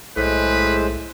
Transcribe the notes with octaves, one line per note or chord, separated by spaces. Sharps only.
B1 A2 G#3 B4 C5